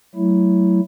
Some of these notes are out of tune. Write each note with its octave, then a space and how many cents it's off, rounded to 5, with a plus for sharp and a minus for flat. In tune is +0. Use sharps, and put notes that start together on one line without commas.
F#3 +20 A3 +5 E4 +0